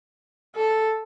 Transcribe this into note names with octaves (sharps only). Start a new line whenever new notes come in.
A4